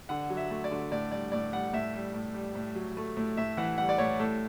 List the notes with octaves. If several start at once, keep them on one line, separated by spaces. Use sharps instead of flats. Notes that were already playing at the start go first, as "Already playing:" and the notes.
D3 F#5
F#3
E5
A3
D5
D3
A2 D5
G3 D5
A2 D5
G3 F#5
A2 E5
G3
A2
G3
A2
F#3
A3
A2
A2 E5
E3 F#5
G3 F#5
D5
A2 C#5
A2 A4